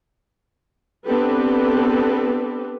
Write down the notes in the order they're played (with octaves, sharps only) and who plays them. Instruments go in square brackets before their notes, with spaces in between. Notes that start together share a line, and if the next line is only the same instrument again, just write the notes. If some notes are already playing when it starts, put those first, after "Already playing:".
[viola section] B3 C4 D4 G4 A4 B4